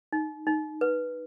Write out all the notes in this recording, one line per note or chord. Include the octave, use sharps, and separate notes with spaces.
D#4
D#4
B4